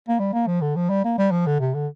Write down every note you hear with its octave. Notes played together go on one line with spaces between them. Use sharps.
A#3
G3
A#3
F3
D3
F3
G3
A#3
G3
F3
D3
C3
D3